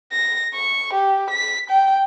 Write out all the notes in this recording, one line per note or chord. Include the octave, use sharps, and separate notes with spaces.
A#6
C#6
G4
B6
G5